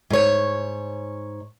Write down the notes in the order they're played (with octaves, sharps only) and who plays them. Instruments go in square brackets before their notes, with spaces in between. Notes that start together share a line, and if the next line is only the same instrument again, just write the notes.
[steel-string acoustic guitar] G#2 C#5